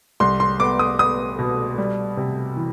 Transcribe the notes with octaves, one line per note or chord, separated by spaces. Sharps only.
C2 C6
C6
B3 D6
D#6
B3 D#6
B2
G3
C3
E3